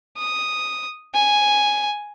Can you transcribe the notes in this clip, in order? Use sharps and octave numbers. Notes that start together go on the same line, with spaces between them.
D#6
G#5